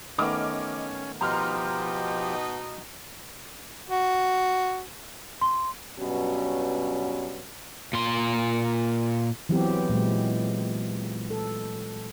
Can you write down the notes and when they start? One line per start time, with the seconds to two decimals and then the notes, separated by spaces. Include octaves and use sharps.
0.18 D#3 A3 B3 C#4 D#5 D6 F6
1.21 B2 F3 D#4 G4 A#5 C6 F6
3.90 F#4
5.41 C6
5.99 G2 B2 F#3 C#4
7.93 A#2 C6
9.49 E3 F#3 B3 C4 G4
9.90 A#2 F#3 G#3
11.31 A4